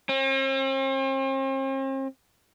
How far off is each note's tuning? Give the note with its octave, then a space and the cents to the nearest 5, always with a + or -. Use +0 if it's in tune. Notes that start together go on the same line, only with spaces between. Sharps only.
C4 +45